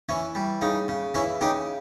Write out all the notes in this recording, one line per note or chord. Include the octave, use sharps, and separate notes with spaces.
E3 C#4
G3
C#3 D#4
C#3
E3 C#4 E4
C#3 D#4 G4